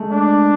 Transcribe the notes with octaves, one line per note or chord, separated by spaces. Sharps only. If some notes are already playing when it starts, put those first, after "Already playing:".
Already playing: G#3 A3
D4